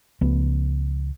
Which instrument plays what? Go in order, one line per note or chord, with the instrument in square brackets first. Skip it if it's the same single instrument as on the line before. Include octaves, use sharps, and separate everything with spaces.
[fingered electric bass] C#2 F3 A3 B3